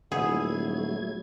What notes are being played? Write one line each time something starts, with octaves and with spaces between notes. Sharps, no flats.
D#1 F#3 A3 B3 E4 G#4 G#6